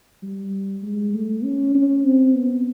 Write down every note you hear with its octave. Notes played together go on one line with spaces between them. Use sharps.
G3
G#3
A3
C#4
C#4
C4
B3